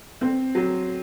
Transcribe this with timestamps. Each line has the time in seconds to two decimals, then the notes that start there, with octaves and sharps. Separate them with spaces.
0.21 C4
0.55 F#3